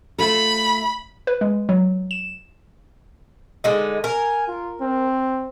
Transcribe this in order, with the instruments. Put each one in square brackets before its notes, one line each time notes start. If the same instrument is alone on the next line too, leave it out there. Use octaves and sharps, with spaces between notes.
[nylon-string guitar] A3 F4 A4 [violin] B5
[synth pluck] B4
G#3
F#3
E7
[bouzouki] D3 G#3 D#4
[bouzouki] A#4 [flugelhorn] G#5
[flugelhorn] F4
C4